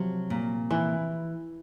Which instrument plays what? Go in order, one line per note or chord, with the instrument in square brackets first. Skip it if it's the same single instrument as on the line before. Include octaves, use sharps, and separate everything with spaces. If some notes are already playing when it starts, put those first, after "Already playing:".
Already playing: [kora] C3 F3 [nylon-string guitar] F#3
[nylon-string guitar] A#2
[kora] E3 [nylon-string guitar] E4